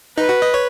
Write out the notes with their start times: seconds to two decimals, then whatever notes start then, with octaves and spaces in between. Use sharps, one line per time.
0.17 D#4 B4
0.29 F#4
0.42 D#5
0.54 C#5